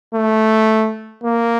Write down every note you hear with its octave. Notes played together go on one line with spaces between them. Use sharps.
A3
A#3